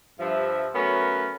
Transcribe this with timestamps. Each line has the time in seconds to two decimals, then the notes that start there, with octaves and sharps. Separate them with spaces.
0.19 G2 F3 E5
0.74 F#3 A3 B3 C#4 F#4 A#4